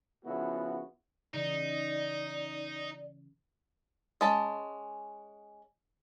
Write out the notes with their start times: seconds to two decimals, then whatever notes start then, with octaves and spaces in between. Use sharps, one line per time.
0.23 C#3 F3 B3 E4 F#4
1.34 C#3 E3 D#4 D5
4.21 G#3 C#4 A5 B5